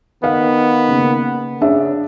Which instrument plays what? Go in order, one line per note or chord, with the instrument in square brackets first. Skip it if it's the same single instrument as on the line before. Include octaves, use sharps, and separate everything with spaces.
[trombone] D#3 [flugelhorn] B3 [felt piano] F5
[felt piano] C#3 A#3
[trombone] C#3 [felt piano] D4 E5